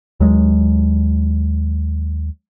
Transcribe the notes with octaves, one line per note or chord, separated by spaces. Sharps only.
D#2 F#3 G#3